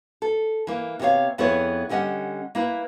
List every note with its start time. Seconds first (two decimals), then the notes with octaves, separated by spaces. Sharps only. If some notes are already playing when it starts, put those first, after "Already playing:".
0.22 A4
0.67 E3 A#3
0.99 C3 B3 F#4 C#5 F5
1.38 F2 B3 E4 G#4 C#5
1.89 D3 G3 C#4 D#5 F#5
2.55 A#3 E4 B4